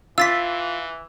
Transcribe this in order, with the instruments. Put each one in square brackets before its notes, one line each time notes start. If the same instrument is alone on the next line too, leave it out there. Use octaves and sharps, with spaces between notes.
[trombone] E3 [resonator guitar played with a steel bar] F4 [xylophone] E6 A6 B6